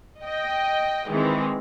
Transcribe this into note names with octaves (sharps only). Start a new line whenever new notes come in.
D#5 G5
D#3 E3 G#3 C4